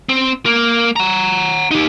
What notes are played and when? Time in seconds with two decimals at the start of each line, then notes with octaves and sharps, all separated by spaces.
0.09 C4
0.46 A#3
0.96 F#5 A#5
1.71 D#4 G4